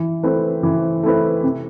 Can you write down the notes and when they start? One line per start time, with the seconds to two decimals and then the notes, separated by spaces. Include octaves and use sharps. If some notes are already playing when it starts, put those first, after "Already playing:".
Already playing: E3
0.23 A3 C4 E4 B4
0.63 E3
1.03 A3 C4 E4 B4
1.43 C3